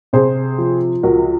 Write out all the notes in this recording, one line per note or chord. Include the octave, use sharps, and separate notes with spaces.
C3 G#4 C5
F3
C#2 F#4 A#4